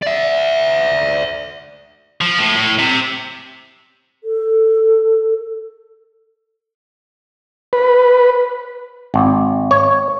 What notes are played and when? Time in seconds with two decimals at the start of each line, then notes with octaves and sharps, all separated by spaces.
0.03 D5 E5
2.21 F3
2.39 A2
2.57 A2
2.79 C3
4.24 A4
7.73 B4
9.14 G#1
9.71 C#5